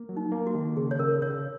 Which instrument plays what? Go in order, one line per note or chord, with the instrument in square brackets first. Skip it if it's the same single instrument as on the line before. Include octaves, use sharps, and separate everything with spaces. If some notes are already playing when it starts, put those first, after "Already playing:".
Already playing: [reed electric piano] A#3
F#3
[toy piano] D#4
[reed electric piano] A#3
[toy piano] F#4
[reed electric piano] D#3
[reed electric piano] C#3 [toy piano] G#4
[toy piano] C#5
[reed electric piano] C#3 [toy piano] A#4
[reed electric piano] C#3 [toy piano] C#5